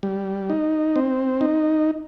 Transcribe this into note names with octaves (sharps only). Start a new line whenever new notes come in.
G3
D#4
C4
D#4